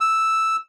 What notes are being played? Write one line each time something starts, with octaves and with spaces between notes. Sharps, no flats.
E6